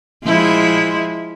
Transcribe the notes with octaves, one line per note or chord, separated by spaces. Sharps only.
F3 G#3 E4